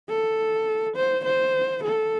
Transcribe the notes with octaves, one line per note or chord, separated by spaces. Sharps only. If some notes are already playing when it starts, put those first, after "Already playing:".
A4
C5
C5
A4